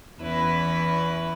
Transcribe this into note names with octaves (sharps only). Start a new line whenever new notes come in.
E2 C#4 E4 B4